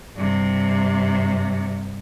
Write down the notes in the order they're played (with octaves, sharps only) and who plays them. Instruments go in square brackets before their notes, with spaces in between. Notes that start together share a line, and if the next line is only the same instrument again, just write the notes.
[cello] G2 C3